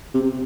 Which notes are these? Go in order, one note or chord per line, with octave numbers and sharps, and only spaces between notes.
C3